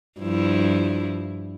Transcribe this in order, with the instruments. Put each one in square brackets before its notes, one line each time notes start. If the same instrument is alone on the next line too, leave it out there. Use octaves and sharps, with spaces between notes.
[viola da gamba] G2 F3 E4